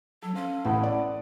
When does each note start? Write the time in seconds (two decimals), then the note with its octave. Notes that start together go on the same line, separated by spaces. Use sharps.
0.22 F#3 A4
0.35 C#4 C5 F5
0.64 A1 A2 B3 E4 A4 F#5
0.83 D5
1.01 D#6